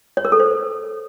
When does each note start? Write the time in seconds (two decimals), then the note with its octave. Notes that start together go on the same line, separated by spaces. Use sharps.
0.17 C#5
0.25 A#4
0.32 A4
0.40 C5